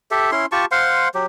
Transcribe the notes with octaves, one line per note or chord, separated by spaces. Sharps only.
G4 A4 E5
C#4 E4 C6
F4 G4 A5 C#6
C5 F5 F#5 C6
F#3 G4